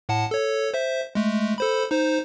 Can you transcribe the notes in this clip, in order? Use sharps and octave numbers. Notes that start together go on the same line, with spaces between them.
A2 F#5 A5
A4 C#5
C5 E5
G#3 A3
A4 C5 B5
D#4 C5